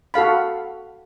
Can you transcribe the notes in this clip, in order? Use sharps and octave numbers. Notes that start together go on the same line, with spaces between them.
F#4 A4 F5 B5